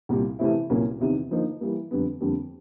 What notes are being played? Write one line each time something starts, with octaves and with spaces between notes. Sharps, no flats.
C2 A#2 G3
C3 E3 A3 C4 E4
C2 A#2 F#3 A#3 C#4
E2 C3 D#3
D3 F3 A#3 D#4
E3 G3 A#3
F2 D3 G3 B3
F2 D3 G3 A#3